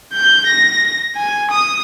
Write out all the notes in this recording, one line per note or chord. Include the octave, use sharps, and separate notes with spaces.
G6
A#6
G#5
D#6